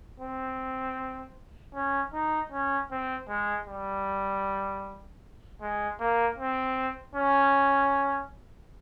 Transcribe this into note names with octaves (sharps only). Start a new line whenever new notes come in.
C4
C#4
D#4
C#4
C4
G#3
G3
G#3
A#3
C4
C#4